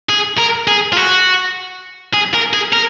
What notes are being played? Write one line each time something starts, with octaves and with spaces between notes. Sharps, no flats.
G#4
A#4
G#4
F4
F#4
G#4
A#4
G#4
A#4